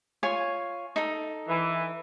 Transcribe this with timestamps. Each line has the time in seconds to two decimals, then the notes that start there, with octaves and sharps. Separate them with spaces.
0.23 F4 C#5 G#5
0.96 D#4 A4
1.48 E3